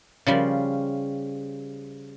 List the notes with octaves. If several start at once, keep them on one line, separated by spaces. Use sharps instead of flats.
C#3 F3 G3